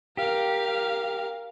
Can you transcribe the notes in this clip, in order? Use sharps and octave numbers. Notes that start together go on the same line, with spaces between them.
G4 A#4 F5